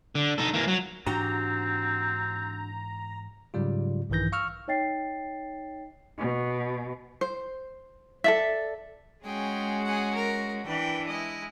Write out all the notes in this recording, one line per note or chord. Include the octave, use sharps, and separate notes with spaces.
D3
D#4 A4
E3 A#3
F#3
G#2 E3 C4 D4 F#4 G4 A#5
G#2 C#3 F#3 G3 F4
A#1 G2 D#3 E3 G6 A#6
F5 C#6 E6 F6
D#4 C#5 D#5 G5 A6 C7
B2
C5
A4 D5 E5
G#3 C#4 F#4 G#4 G5
G#4 F#5
A#4
E3 D4 B4 G5
G#3 E4 D#5